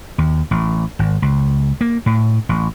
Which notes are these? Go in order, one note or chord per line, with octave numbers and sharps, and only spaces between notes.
D#2
A1
G#1
C#2
A#3
A2
A1